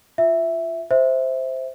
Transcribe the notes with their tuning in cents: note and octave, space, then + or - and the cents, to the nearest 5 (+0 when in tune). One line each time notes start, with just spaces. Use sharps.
F4 +0 E5 +0
C5 +0 E5 -10